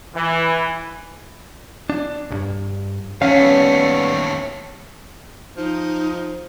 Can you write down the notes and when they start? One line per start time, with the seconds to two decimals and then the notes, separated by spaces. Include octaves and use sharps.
0.16 E3
1.90 D4
2.30 B1 G2
3.22 D#2 A3 C#4 F5
3.39 G3 B3
5.57 F3 D#4